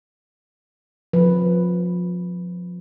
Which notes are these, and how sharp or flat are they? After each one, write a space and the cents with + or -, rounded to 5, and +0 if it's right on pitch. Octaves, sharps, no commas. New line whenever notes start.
F3 +30 B4 +0